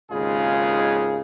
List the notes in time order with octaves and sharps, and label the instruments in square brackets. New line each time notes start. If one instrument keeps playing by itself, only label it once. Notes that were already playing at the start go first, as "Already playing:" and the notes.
[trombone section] G#1 D#2 C#3 G#3 F4 G#4